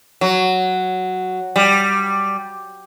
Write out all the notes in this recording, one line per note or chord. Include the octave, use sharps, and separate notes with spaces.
F#3
G3